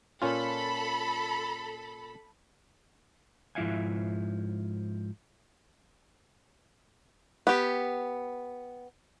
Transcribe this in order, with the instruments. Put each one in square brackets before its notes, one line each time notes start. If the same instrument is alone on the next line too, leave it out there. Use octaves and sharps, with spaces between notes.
[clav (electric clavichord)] A#2 C#4 F4 [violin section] A4 B5
[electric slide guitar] G#2 F3 E4 E5 F5 G#5
[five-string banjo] B3 G4